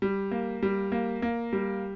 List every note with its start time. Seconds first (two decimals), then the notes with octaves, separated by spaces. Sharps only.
0.02 G3
0.31 A#3
0.63 G3
0.92 A#3
1.22 A#3
1.53 G3